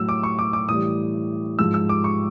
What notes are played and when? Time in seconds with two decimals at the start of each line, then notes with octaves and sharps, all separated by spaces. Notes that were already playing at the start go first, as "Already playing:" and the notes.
Already playing: A2 F#3 E6
0.09 D6
0.23 C#6
0.39 D6
0.53 D6
0.68 A2 E3 G3 D#6
1.59 G#2 F3 G#3 E6
1.74 E6
1.89 D6
2.04 C#6